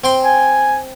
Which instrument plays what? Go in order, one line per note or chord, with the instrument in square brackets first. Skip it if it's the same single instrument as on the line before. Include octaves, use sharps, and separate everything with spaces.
[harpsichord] C4 G5 C6
[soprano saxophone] G#5